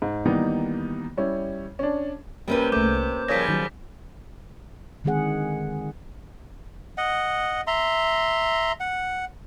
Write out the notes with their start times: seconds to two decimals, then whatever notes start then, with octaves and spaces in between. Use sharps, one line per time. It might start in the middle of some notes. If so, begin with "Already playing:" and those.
0.02 G#2
0.25 D#3 E3 G3 A#3 B3 D#4
1.17 G3 C#4 E4
1.79 C#4 D4
2.48 C3 G3 A#3 C#4 B4
2.72 C2 C3 A3 D6 G6
3.28 C#3 F3 G3 A#4 C#5 G#6 A#6 B6
3.49 D#3 F#3
5.04 D3 D#3 G#3 C4 G#4 F#5
6.98 D#5 F#5
7.67 E5 A#5 C6
8.80 F#5